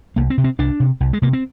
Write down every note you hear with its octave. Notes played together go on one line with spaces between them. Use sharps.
C2 A#3
C4
C3
C4
C2 D4
C3
C2
G#3
C3 A#3
C4